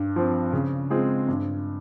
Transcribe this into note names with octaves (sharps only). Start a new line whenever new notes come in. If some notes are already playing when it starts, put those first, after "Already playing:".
Already playing: G2
F3 C4
C#3
G#3 C4 F4 G#4
G2